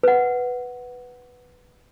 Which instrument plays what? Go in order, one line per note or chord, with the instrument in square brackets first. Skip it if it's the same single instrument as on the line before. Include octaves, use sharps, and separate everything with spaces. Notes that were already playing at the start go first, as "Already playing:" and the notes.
[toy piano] B4 F#5